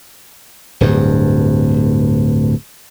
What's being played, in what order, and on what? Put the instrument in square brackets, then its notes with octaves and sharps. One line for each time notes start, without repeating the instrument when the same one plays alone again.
[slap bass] D1 G2